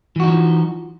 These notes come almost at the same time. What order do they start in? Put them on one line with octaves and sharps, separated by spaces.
E3 F#4 D#4 F3